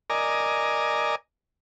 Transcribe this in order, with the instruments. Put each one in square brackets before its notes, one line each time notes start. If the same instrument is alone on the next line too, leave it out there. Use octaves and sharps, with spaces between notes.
[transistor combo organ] A#4 D5 D#5 G#5